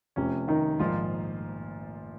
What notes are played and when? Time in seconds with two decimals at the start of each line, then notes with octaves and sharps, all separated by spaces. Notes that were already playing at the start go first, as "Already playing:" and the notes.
0.16 F1 F2 C3 C#4
0.48 D#3 D#4
0.79 A#1 G#2 D#3 F3 F4